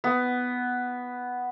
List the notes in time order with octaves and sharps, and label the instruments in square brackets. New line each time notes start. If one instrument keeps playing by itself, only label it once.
[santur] B3